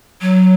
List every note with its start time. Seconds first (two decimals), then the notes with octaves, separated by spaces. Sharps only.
0.21 F#3